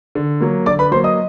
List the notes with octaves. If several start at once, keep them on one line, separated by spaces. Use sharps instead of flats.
D3
F#3 A#3
D3 D5 D6
B4 B5
F#3 A#3 C5 C6
D#5 D#6